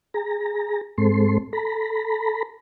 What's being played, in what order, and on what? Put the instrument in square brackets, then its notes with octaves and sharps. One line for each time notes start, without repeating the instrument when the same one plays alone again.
[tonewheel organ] G#4 A#5
G#2 G#3 C4 A4 C6
A4 A#5 B5